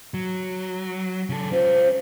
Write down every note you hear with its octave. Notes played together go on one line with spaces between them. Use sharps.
F#3
C#3 A4
C#4 F4 C5